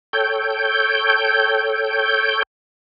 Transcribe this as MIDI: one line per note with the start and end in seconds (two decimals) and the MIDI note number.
0.13 2.43 69
0.13 2.43 73
0.13 2.43 79
0.13 2.43 91